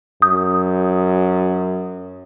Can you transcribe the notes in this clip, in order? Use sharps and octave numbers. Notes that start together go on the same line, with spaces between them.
F#2 D#6